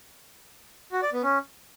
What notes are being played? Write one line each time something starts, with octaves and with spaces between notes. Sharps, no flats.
F#4
D5
B3
C#4